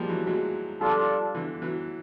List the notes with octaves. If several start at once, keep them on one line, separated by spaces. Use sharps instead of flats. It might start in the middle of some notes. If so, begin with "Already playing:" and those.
Already playing: F3 G3 G#3 A#3
E3 F#3
F#3 G#3
F3 G3 D4 F4 A4
D3 E3
E3 F#3